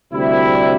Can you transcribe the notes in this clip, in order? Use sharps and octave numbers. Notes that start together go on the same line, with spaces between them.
D2 C3 G3 E4